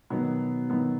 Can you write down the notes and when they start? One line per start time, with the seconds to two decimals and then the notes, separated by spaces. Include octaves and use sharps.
0.10 B2 D#3 F#3 B3
0.70 D#3 F#3 B3